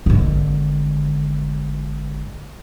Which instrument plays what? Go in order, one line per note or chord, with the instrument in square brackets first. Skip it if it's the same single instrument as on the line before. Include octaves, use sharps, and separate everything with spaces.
[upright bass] G#1 D3